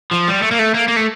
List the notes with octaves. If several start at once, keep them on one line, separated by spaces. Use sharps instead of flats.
F3
G3
A3
A#3
A3
A#3
A#3
A3